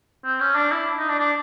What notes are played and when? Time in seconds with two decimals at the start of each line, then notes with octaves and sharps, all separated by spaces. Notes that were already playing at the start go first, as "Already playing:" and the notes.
0.24 C4
0.40 C#4
0.55 D4
0.72 E4
0.98 D#4
1.09 D4
1.19 D4